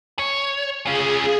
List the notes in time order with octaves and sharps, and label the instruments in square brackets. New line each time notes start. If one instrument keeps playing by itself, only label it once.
[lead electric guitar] C#5
[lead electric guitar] C#4 F4 [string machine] G#4